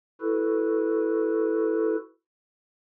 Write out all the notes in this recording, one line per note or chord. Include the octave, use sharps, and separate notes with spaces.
E4 F#4 A4 B4